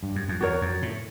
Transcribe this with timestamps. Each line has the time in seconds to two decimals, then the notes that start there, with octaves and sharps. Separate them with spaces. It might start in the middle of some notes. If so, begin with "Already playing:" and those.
0.03 G2
0.16 F#2
0.28 F2
0.41 E2 F#4 A#4 C#5
0.61 F2
0.82 A2